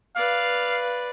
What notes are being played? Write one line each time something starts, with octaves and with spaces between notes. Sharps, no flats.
B4 D5 F5